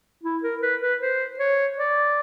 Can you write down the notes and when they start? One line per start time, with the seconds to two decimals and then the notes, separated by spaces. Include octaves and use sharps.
0.23 E4
0.43 A#4
0.62 B4
0.82 B4
1.01 C5
1.39 C#5
1.78 D5